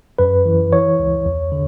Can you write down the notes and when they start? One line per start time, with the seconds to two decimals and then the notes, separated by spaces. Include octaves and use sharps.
0.19 F#2 B4
0.46 E3
0.72 E3 C#5
0.99 C#2
1.25 E2
1.52 D3